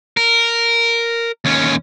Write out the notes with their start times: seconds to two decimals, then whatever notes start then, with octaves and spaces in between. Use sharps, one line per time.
0.17 A#4
1.45 D#2 C#4